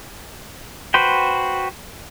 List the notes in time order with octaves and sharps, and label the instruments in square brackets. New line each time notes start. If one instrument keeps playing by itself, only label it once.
[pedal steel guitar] F#4 B4 C5 G5